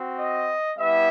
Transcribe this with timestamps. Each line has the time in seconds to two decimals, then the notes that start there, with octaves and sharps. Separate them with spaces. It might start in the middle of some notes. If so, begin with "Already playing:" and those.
Already playing: C4 F#4
0.19 D#5
0.77 G3 B3 E4 E5